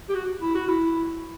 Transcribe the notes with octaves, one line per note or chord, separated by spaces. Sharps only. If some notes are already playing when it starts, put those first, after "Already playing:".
G4
F#4
E4
F#4
E4